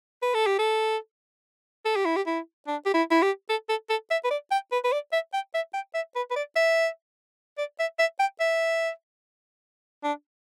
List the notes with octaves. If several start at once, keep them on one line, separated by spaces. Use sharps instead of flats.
B4
A4
G4
A4
A4
G4
E4
G4
E4
D4
G4
E4
E4
G4
A4
A4
A4
E5
B4
D5
G5
B4
B4
D5
E5
G5
E5
G5
E5
B4
B4
D5
E5
D5
E5
E5
G5
E5
D4